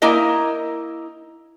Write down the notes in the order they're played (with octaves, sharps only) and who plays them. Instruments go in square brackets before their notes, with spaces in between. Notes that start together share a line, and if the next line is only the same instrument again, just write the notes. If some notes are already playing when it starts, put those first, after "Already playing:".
[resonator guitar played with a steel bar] A#3 D#4 E4 A#4 D#5